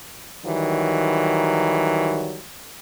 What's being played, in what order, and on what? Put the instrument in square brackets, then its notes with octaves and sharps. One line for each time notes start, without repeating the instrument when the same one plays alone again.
[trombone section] D#3 E3 F#3 G3